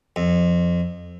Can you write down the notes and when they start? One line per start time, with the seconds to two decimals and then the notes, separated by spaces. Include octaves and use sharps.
0.16 F2